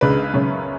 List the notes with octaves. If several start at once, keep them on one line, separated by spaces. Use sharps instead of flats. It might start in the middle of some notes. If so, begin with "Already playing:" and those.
C#2 C#3 G#3 D4 B4
F#2 C#3 G#3 C#4